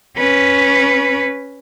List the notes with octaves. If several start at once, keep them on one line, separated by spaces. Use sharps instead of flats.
C#4 B4